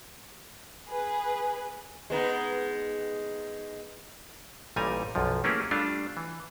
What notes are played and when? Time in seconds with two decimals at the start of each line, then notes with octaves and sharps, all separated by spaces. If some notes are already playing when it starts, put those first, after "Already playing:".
0.89 G#4 B4
2.10 G#3 B3 D#4
4.76 A1 A#2 G3 D#4 G#5 A#5
5.15 B1 F#2 F3
5.44 A3 A#3 C#4 E4 G4 G#4
5.71 G3 A3 D4 F4
6.17 E3